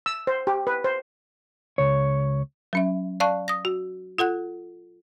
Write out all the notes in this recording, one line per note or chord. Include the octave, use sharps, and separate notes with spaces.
E6
C5
G4
B4
C5
C#2 C#5
F#3 C#4 E5
D5 F5 A5 C#6 F#6
D#6 A#6
F#4
F4 A4 F#5 F#6